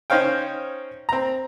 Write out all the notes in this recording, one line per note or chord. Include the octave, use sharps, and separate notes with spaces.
C#4 D#4 C5 C#5 F5 G5
C4 A#5